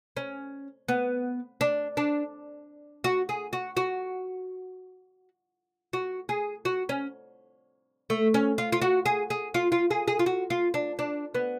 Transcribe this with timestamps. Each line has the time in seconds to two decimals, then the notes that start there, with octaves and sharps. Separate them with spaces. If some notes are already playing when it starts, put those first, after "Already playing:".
0.17 C#4
0.88 B3
1.61 D4
1.97 D4
3.04 F#4
3.29 G#4
3.53 F#4
3.77 F#4
5.93 F#4
6.29 G#4
6.65 F#4
6.89 C#4
8.10 A3
8.34 C#4
8.58 F4
8.72 F4
8.82 F#4
9.06 G#4
9.30 G#4
9.54 F4
9.72 F4
9.91 G#4
10.08 G#4
10.19 F4
10.26 F#4
10.50 F4
10.74 D4
10.99 D4
11.34 B3